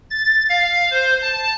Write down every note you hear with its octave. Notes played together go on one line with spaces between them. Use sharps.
A6
F5
C5
A5